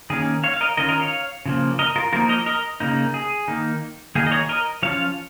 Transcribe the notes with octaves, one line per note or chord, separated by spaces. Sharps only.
D#3 A#3 C#4 G#4
C#5 F5
F5
A#4 D#5
D#3 C#4 F4 A#4 D#5
A#4 D#5
C#5 F5
C#3 F3 A#3
A#4 D#5
F4 A#4
F3 A#3 D#4 F4 A#4
A#4 D#5
A#4 D#5
C#3 A#3 D#4
G#4
D#3 A#3 D#4
D#3 A#3 D#4 G#4
D#5
G#4 C#5
A#4 D#5
F3 C#4 F4 C#5 F5